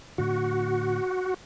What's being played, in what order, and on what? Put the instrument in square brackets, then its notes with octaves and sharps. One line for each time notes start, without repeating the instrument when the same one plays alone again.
[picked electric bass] A2 D3 [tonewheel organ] F#4